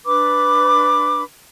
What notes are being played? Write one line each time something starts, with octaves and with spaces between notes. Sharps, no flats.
D4 B4 B5 D6